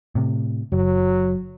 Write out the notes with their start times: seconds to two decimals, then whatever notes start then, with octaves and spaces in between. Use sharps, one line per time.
0.15 A2 C3
0.72 F#1 F#3